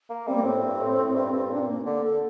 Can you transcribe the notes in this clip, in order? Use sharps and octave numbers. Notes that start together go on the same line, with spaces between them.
A#3
G3 C4
A#3
A2 C4
G2
A2
A2
G2
G2
A#2 D4
C4
A#3
D3 A#3
A4